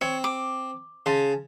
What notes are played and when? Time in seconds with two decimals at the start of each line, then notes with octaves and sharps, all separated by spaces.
0.01 C4 C#5
0.24 D6
1.06 C#3 G#5 A5 C6